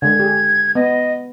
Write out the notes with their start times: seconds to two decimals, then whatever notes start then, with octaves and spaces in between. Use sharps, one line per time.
0.02 D3 G#3 G#6
0.20 G4 G#4
0.75 B3 D#5